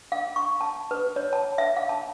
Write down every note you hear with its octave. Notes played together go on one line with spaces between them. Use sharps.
F5
C#6
A5
B4
C#5
A5
E5
F5
A5